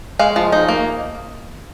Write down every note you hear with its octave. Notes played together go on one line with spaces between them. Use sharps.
G#3 F5
F3
D#4
A#3